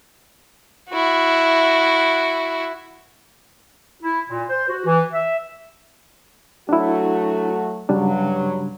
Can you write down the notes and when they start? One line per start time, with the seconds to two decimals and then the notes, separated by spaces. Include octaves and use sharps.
0.90 E4 F#4
4.03 E4
4.29 A#2
4.50 C5
4.68 F#4
4.86 E3
5.13 E5
6.69 F#3 A3 D4 E4 F#4
7.89 G2 C#3 F#3 G3 D4